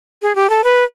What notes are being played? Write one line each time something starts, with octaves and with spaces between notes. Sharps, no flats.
G#4
G4
A4
B4